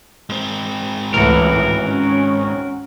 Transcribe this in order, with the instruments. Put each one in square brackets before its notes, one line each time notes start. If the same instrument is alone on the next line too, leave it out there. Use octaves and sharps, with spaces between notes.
[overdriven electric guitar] G#2 C4
[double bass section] C#2 A2 E3 [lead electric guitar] F#4 A#4
[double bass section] C#4